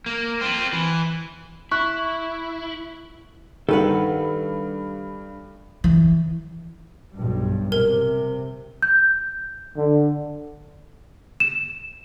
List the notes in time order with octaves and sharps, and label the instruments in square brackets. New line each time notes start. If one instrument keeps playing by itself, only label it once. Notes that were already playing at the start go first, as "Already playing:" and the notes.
[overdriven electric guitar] A#3
C4 F4
E3
[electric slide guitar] E4 [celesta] C#6 F#6
[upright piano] G2 [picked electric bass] D#3 [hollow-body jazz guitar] A4 B4 F#5
[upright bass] E3
[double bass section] B1 G2 G3
[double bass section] C3 [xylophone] A#4
[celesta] G6
[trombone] D3
[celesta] E7